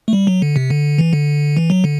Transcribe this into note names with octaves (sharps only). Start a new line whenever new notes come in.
A3
G3
F#3
D3
C3
D3
E3
D3
E3
F#3
D3